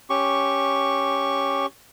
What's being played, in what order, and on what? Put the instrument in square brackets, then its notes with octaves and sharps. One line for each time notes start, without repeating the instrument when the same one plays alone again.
[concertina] C#4 G4 C#6